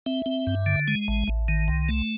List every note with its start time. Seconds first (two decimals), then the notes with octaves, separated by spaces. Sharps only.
0.06 C4 E5
0.26 C4
0.47 G2
0.66 D3
0.88 G#3
1.08 A1
1.28 A1
1.48 D#3
1.68 C2
1.89 A3